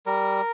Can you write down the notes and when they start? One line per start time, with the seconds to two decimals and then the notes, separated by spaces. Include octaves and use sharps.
0.06 G3 A#4